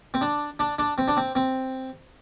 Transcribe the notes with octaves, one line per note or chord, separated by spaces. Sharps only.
C4
D4
D4
D4
C4
D4
C4
C4